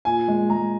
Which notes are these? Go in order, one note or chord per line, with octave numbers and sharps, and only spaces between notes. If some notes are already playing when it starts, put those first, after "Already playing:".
A#2 G#5
G#3
G#3 A#5